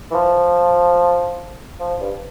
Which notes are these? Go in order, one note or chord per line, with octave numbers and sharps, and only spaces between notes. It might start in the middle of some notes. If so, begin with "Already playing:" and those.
E3
F3
F3
G2